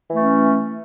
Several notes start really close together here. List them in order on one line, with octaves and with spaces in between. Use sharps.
E3 A3 C#4